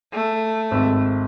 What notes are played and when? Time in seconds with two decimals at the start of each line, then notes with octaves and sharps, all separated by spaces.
0.13 A3
0.71 G#1